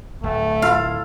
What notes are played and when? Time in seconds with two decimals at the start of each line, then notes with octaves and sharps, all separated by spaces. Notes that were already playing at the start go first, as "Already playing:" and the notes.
0.23 D1 A3
0.62 E4 F4 A4 F5